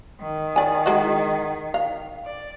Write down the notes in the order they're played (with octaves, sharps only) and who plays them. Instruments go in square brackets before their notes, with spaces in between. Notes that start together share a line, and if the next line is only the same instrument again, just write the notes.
[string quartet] D#3
[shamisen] D5 G#5
G#3 E4 F#4
F5
[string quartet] D5